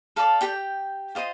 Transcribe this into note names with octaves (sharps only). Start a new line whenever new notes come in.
A4 D5 F5
G4 G5
F4 C5 D#5